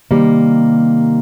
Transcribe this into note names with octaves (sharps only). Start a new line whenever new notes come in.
C3 D#3 G3 A#3